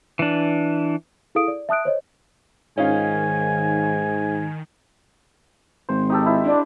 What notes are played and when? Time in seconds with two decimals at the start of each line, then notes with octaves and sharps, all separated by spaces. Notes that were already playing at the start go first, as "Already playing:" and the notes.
0.19 E3 D4
1.35 E4 G#4 A4 F5 D#6 D7
1.48 D5
1.69 E5 A5 D#6 F#6 D7
1.85 C5 C#5 D#5
2.78 G#2 D#3 C#4 D#4 F4 G#5
5.89 G#1 C5
6.10 D#4 G4 A4
6.26 E4
6.44 D4